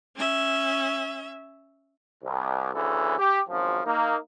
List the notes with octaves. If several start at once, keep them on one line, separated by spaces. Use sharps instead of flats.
C#4 E5
C2
D2 C#3 E3 A4
G4
G#1 F#2 F3
A#3 D#4